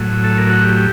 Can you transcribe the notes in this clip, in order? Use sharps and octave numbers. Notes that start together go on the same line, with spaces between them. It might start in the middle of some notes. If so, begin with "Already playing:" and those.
Already playing: A2 F#3
A4
A#4
F#4
G4
G4